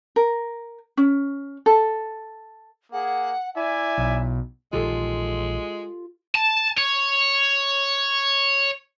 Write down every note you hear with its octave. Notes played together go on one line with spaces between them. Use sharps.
A#4
C#4
A4
A#3 G#4 F#5
E4 D5 E5 G#5
B1
A#1 D#3 E3 G#3 F4 G4 A4
A5
C#5